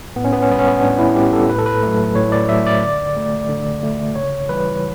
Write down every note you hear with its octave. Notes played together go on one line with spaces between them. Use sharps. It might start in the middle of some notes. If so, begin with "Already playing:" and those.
A2 B3
C#4
B3
C#4
G3 B3
C#4
B3
A2 D4
E4
G3 G4
A4
A2 B4
A4
B4
F#3 A3
A2 C#5
D5
F#3 A3 E5
D5
D3
A3
D3
A3
C#3 C#5
E3 G3 B4